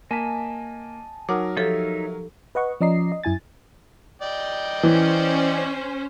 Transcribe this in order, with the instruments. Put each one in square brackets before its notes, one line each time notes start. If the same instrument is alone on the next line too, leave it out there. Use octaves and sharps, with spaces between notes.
[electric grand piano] A#3 B6 [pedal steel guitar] D#5 G#5 A5
[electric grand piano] F#3 A#4 [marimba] D#4 F#5 D6
[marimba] F3 G4 A4 [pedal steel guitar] D#4 C#5 E5
[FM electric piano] B4 D#5 F#5 C#6
F3 C#4 D5 D#5 A#5 C7
D#5
F#2 E4 G#5 A6
[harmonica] D5 D#5 G5
[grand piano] E3 [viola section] C#4 C5